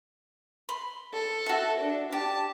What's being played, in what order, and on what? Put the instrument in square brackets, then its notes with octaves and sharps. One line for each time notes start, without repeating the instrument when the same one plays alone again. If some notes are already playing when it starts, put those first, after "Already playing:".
[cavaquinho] B5 C6
[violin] A4
[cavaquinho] F#4 E5
[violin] D4
[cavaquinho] G4 [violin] A5